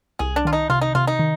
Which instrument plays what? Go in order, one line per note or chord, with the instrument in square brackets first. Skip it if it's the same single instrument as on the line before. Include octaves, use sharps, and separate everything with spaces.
[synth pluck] C2 [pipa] G#4
[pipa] D4
[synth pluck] D#3 [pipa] F4
[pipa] D#4
[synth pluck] C3 [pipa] F4
[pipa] D#4
[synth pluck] C3 [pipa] F4
[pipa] D#4
[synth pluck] D#3